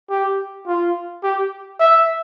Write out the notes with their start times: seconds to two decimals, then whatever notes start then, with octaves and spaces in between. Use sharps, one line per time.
0.10 G4
0.67 F4
1.23 G4
1.80 E5